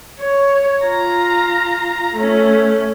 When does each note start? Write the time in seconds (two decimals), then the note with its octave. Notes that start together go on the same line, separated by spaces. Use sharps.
0.19 C#5
0.85 F4 A#5
2.14 A3 C#4